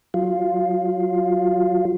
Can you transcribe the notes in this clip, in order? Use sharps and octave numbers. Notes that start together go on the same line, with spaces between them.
F#3 F4